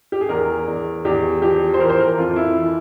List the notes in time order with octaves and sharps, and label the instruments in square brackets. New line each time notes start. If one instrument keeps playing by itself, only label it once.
[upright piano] G4
G#4
E2 A#4
E2
E2 G4
F3 G4
C5
E3 A#4
C5
A#4
F2 F4
E4
E3